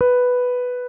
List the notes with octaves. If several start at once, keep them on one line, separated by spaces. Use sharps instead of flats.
B4